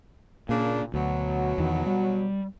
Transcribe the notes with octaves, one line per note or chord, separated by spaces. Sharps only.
A#2 C#3 A#3 D4
D2 B2 F#3
E2 D#3
G3